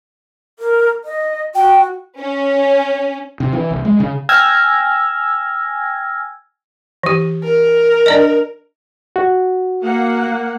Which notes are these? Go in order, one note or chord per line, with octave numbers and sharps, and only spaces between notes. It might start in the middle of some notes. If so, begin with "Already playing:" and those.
A#4
D#5
F#4 G5
C#4
C3
E3
C2
G#3
C#3
G5 G#5 E6 F6 G#6 A#6
E3 G4
A#4
D4 D5 D#5
F#4
A#3 F#5